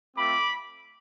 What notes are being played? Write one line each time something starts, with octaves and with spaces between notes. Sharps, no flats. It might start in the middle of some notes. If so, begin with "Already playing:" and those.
A3 C4 F4 B5 D6